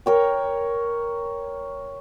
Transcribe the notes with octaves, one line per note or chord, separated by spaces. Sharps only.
A#4 C#5 G5